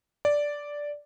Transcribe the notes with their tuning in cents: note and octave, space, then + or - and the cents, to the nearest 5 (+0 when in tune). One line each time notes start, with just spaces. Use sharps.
D5 -5